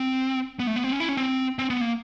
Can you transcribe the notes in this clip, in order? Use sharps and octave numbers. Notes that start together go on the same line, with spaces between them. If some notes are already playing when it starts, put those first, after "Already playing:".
Already playing: C4
B3
A3
B3
C4
C#4
E4
C#4
C4
C4
B3
A#3